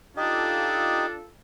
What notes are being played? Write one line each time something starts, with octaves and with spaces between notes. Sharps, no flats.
D4 D#4 F4 G4 A4 D#5